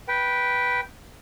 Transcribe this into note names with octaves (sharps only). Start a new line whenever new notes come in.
B4 G5